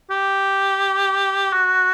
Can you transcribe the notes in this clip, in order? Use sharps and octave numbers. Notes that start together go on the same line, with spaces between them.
G4
F#4